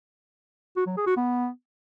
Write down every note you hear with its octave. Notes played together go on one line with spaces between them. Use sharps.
F#4
F#3
G#4
F#4
B3